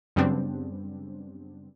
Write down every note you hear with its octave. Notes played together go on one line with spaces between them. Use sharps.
F#2 C#3 G3 B3 C4 D4